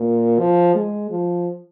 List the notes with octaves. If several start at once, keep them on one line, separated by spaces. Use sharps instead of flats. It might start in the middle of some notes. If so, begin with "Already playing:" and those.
Already playing: A#2
F3
G#3
F3